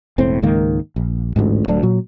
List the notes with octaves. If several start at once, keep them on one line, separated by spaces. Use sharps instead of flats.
E1 A2 C4
C#2 G#2 D#3 A#3
A#1
A1 D2 G#2
D1 D2 F#3 D4
A#2 F#3